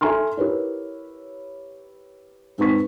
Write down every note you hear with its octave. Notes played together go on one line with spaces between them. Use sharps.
A4 E5 G#5 A#5 C6 F6
E4 G4 A#4 B4 C#5
G#2 C4 B4 C#6 B6